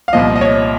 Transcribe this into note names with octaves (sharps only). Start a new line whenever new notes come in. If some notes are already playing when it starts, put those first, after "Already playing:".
F5
C2 A#2 F3 D#5
D#5
C#5